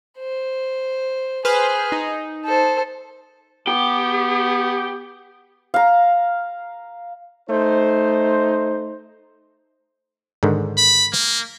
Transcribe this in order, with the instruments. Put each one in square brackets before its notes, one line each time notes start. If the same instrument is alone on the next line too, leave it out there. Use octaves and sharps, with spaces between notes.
[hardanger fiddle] C5
[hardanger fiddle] G#4 [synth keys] B4 C5 F6
[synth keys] D#4
[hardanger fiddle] A4 C5
[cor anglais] B3 [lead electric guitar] G4
[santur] F5 A#5
[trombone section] A3 D#4 C5
[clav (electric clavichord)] G#2 D3 D#3
[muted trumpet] B5
A#3